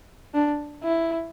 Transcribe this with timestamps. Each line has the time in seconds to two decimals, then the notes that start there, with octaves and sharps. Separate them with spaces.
0.34 D4
0.83 E4